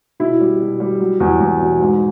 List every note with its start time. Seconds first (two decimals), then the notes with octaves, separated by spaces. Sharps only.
0.20 B2 E4
0.41 G3
0.60 B2
0.80 G3
1.00 F#3
1.20 E2
1.40 E2
1.61 B2
1.80 G#2